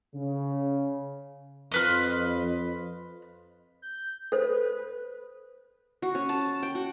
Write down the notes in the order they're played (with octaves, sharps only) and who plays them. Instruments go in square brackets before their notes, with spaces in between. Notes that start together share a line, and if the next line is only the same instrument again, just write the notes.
[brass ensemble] C#3
[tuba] F2 [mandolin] F4 B4 D#5
[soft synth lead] G6
[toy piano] A4 C5 [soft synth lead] B4
[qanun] F#4
C#4
A5
G5
F#4